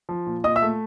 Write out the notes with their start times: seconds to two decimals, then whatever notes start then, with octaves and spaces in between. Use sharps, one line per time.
0.09 F3
0.27 A#2
0.44 A#2 D#5 D#6
0.56 E5 E6
0.62 A3